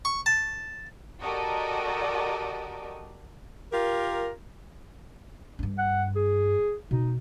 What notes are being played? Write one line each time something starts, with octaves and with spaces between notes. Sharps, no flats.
C#6
A5
F#4 G4 A4 A#4 D5 D#5
F4 G4 A#4
G2 D4
F#5
G#4
B2 D#4